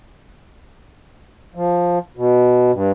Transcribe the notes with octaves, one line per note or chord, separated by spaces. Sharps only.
F3
B2
G2